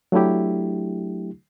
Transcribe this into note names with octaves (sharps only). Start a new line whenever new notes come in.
F#3 A3 D4 E4 G4